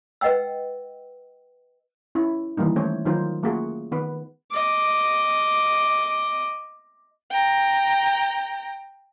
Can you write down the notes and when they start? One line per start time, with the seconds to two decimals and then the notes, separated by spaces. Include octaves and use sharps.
0.21 B4 D#5 F#5 G5 E6
2.15 C#4 E4
2.57 D#3 E3 G3 A#3 D#4
2.76 A3 C#4 C5 C#5
3.05 D#3 F#3 D#4 F4 C5
3.43 A3 A#3 C#4 F4 F#4 G#4
3.92 D#3 B3 B4
4.51 D#5 D6
7.31 G5 A#5